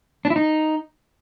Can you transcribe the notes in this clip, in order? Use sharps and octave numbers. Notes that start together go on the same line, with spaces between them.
D4
E4
D#4